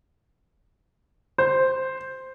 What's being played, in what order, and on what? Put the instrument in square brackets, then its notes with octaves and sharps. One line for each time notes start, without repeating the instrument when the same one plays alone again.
[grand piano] C5